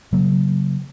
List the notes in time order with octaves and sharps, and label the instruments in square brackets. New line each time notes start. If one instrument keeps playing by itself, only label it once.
[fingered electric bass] C#3 F#3 A#3